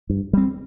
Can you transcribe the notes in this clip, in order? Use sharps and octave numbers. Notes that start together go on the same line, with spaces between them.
G2
G3 C4